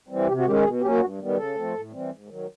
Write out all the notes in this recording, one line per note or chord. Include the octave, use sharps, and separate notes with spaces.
E3 G3 C4
C3 G4
F#4
D#3 G#3 C#4 G4
B2 G#4
F#3 A#3 C#4 G4
G2 F#4
D#3 G3 B3
C#3 A4
F3 A3 C4
A2
E3 G3 C4
G#2
D#3 F#3